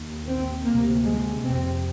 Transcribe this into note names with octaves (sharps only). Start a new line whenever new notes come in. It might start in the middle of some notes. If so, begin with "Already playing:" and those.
Already playing: D#2
C4
D2 C3 A#3
G#3
F2 C3 C4